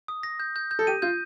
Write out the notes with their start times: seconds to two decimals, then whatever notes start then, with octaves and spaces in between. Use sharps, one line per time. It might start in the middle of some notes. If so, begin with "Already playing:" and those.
0.08 D#6
0.23 A#6
0.40 G6
0.56 G6
0.71 G6
0.79 A4
0.87 G4 D#7
1.02 F4 G6